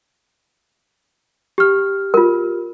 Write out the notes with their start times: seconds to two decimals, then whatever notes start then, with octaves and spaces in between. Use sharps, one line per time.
1.58 G4 F6
2.14 F4 A#4